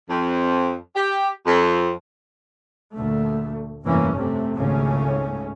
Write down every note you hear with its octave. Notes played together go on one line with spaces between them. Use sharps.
F2
G4
F2
D2 A#2 A3
F1 G2 E3 A#3 C#4
C3 A3
G#1 C#2 C#3 A3 C#4